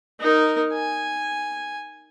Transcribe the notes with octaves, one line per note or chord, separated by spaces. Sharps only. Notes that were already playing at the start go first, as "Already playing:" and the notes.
D#4 A#4
G#5